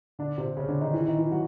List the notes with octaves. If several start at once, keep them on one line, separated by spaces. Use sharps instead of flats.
D3 D4
C3 C4
C#3 C#4
D3 D4
D#3 D#4
E3 E4
D#3 D#4
E3 E4
F#3 F#4